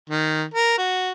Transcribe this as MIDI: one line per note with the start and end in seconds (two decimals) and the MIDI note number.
0.09 0.44 51
0.54 0.77 70
0.78 1.12 66